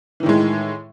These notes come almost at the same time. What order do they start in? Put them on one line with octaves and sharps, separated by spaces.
E3 D#3 A2 G#3